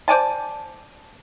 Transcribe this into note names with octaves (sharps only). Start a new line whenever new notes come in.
C5 D5 G#5 A5